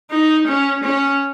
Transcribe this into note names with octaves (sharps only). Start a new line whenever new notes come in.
D#4
C#4
C#4